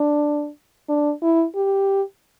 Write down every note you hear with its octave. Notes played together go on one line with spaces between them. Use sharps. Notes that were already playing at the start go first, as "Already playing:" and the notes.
Already playing: D4
D4
E4
G4